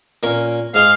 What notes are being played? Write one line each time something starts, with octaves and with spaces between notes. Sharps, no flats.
A#2 C#4 A#4
G#2 G#4 F5 C6